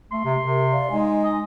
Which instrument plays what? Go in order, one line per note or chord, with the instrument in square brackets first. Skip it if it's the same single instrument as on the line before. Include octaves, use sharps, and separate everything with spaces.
[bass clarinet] A3 [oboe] C6
[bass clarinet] C3
[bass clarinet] C3 [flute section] A#4
[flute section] D5 F5
[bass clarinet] G#3 [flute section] D#4 G#5
[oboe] D#5